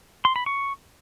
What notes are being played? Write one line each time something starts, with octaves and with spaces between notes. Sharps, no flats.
C6
B5
C#6